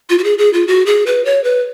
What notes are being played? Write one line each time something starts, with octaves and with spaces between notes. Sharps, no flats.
F4
F#4
G#4
G#4
F4
F#4
G#4
B4
C#5
B4